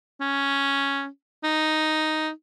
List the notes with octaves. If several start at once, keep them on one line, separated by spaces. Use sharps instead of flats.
C#4
D#4